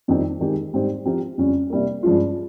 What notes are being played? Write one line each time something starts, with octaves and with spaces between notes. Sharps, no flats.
F2 D#3 G3 C4 D#4
D#3 G#3 C4 G4
G#2 G3 C4 G4 C5
F3 C4 G4 A#4
F2 C#3 G3 C#4
C3 G3 A#3
G2 F3 G#3 C#4 F4